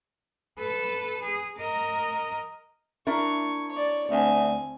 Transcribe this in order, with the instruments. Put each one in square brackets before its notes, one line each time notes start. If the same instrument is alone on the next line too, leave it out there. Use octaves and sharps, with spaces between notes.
[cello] A4 B4
G#4
A#4 D#5
[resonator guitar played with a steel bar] D4 E4 A#4 [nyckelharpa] C#6
[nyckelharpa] C#5 D5
[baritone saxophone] D2 [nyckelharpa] C4 G#5